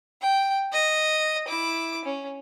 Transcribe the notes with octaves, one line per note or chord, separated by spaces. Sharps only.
G5
D#5
E4 D6
C#4